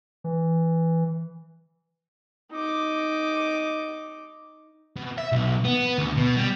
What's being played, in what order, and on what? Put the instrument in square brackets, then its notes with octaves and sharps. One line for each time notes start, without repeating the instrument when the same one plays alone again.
[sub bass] E3
[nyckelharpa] D#4 D6
[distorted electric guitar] B2
E5
B1
B3
D2
B2
G3